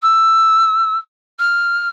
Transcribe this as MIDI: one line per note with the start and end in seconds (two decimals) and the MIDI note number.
0.02 0.97 88
1.39 1.89 89